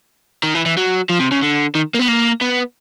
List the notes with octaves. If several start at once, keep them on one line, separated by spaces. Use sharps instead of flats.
D#3
E3
E3
F#3
F3
C3
C#3
D3
D#3
A#3
B3
A#3
B3